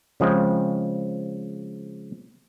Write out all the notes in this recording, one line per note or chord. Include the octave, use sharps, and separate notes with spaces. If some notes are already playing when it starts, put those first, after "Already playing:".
C#3 F3 G#3 C4